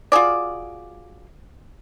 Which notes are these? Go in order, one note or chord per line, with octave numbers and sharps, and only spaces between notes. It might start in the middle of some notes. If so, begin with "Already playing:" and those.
F4 F#4 G#4 D5